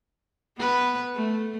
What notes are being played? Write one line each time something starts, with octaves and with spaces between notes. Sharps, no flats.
B3 B4
A3